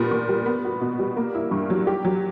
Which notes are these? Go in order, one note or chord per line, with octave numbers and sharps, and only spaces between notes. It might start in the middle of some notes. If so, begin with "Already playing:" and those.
Already playing: A#2 G3 B3
A#2
G3
B3
F#4
B2
G3
A#3
E4
G2
F#3
G4
F#3